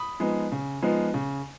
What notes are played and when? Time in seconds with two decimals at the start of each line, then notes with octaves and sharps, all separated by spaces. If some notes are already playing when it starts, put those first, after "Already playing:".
Already playing: B5 D#6
0.20 F3 G#3 B3 D#4
0.52 C#3
0.82 F3 G#3 B3 D#4
1.14 C#3